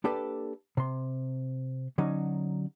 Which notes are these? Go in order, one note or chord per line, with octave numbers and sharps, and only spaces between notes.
A#3 D4 G4 A4 B4 D5
C3 C6
D3 F#3 C#4 D#4